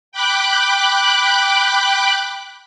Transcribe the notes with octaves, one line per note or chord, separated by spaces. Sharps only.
G5 B5 D6 F#6